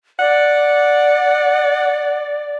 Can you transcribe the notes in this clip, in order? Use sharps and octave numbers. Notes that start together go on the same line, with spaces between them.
D5 F#5